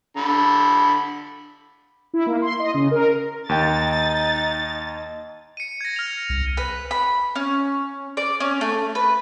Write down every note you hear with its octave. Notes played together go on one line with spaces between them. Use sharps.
D3 B5
E4
A#3
C6
D#5
C#3
A#4
D#2 D#4 G5 A6
C#7 D#7
G#6 A#6
F6 F7
C2
B4
B5
C#4
D5
C#4
A3
B4